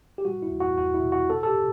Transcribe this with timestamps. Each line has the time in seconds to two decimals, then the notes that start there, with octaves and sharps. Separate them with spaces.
0.18 G4
0.25 G3 F#4
0.43 E4
0.51 E2
0.60 F#4
0.78 E2 F#4
0.94 E4
1.04 B2
1.12 F#4
1.30 C4 A4
1.43 A4
1.47 G4